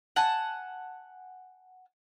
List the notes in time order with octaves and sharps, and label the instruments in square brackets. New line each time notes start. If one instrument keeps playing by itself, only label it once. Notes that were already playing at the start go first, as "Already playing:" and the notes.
[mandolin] F#5 G#5 A5